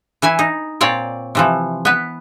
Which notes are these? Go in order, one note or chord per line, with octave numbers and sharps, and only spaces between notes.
E3 E4 G#5
D#4
A#2 C4 C#5 D5
C3 E3 F3
B3 B4